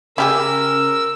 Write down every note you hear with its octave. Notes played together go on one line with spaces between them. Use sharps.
C#3 C#4 G4 G#4 A#4 E6